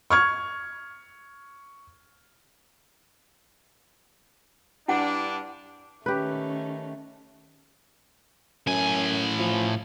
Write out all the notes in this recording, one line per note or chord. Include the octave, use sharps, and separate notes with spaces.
C#6 F6 G#6
G2 D4 E4 F#5
D#3 A3 C#4 G4 B4
F#2 A2 G#5
F3